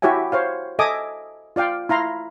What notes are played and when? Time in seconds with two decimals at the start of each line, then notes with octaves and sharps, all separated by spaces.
0.02 E4 F#4 G4 C#5 E5 G#5
0.32 C5 C#5 F5
0.79 A4 D#5 E5 G#5 D6 D#6
1.56 F4 D5 F5 G5
1.89 E4 F5 A#5 C6